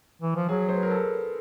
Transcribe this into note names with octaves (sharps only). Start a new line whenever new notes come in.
E3
F3
F#3 G#4
C5
B4
A#4
A4